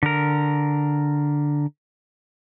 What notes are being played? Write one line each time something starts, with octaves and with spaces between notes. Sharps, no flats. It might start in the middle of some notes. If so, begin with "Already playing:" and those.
D3 A#4